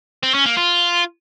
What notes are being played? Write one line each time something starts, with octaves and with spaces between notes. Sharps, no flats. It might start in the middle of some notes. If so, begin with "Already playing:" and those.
C4
C#4
A#3
F4